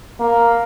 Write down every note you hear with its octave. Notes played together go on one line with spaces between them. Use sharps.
A#3